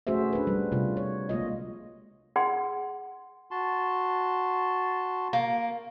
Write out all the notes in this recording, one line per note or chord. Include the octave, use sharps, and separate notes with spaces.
A3 C#4 F#4 G#4 C5 E5
D4 B4
G3
C3 F4
C#5
G#3 A#3 F4 D#5
G#4 F#5 C6
F#4 A5 C6
A#3